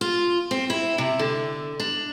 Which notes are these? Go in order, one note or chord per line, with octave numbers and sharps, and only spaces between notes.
F4
C4
E4
C3
D3
D4